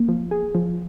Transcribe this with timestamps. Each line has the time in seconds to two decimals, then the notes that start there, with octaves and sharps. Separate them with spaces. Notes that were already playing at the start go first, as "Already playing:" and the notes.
Already playing: A#3
0.09 F3
0.31 G#4
0.55 F3